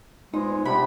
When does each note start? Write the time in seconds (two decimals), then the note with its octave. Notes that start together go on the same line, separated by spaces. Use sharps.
0.34 A#2 G#3 B3 D#4 C5
0.65 C3 C4 D4 F#5 B5